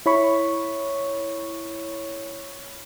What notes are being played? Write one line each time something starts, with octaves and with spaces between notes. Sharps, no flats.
E4 C#5 B5 C#6